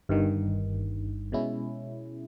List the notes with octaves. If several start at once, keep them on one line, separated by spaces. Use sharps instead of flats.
G1 G2 D#3
B2 G#3 C#4 E4